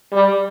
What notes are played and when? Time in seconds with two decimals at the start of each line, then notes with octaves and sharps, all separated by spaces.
0.13 G3